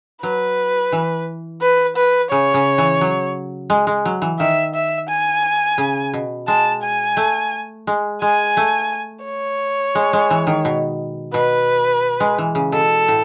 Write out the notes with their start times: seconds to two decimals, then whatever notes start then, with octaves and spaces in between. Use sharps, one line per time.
0.22 F#3 B4
0.92 E3
1.62 B4
1.96 B4
2.31 C#3 C#5
2.54 C#3
2.78 E3
3.01 F#3
3.70 G#3
3.87 G#3
4.05 F#3
4.22 E3
4.39 D#3 E5
4.74 E5
5.09 G#5
5.78 C#3
6.14 B2
6.48 G#3 A5
6.82 G#5
7.17 A3
7.87 G#3
8.22 G#3 G#5
8.57 A3
9.25 C#5
9.95 G#3
10.13 G#3
10.30 E3
10.47 D#3
10.65 B2
11.34 B2 B4
12.20 G#3
12.38 E3
12.55 C#3
12.72 B2 A4
13.08 A2